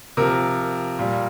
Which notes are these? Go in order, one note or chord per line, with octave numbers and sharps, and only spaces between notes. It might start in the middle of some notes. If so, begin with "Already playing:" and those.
C3 F3 A#4
A#2 G3